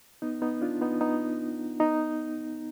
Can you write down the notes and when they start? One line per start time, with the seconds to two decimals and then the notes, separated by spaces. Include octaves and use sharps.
0.22 B3 D#4
0.42 B3 D#4
0.61 D4 F4
0.82 B3 D#4
1.01 B3 D#4
1.80 B3 D#4